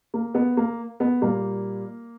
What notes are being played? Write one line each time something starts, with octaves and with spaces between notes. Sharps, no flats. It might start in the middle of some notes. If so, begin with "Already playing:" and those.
A#3
B3
A#3
B3
A#2 G3 A#3